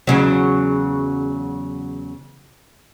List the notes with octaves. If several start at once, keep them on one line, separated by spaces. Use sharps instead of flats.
E2 C#3 F#3